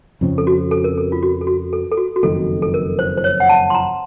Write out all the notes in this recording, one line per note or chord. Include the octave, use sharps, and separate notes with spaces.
F2 C#3 F3 C4
A4
F#4
A4
A#4
A4
F4
F#4
A4
F#4
A4
A4
F#4
F#4
F#1 F2 D#3 A4
A4
A#4
C5
C5
C#5
F#5
A5
C6
A#5